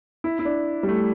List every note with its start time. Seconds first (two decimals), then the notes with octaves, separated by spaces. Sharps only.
0.24 E4
0.39 E4
0.45 D4
0.83 G3
0.88 A3